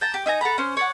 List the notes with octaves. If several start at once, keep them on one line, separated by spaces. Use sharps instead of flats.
G5 A5 A#5
G4
D#4 E5 G#5 A#5
A4 F#5 A#5 B5
C#4 C5
C#5 D5 F#5